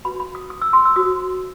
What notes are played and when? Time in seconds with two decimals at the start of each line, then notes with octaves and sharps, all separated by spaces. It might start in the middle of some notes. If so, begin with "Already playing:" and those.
0.04 F#4 B4 B5
0.20 B5
0.35 D#6
0.50 D#6
0.62 E6
0.73 C6
0.85 E6
0.96 F#4 C5 D#6